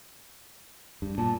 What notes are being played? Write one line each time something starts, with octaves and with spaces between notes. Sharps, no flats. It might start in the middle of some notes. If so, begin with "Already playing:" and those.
G2
A#2 A5